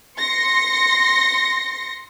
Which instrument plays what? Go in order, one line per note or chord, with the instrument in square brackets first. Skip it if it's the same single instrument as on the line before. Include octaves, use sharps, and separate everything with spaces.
[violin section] C6 A#6 C#7